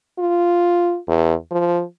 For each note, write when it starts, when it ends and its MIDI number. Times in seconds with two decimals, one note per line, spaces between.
0.19 0.98 65
1.08 1.34 40
1.51 1.83 53